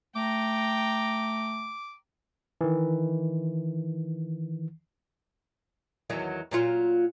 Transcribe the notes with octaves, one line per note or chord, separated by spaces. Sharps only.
A3 G5 A#5 D6
D#3 E3
E2 D#3 F#3
A#2 F#3 F4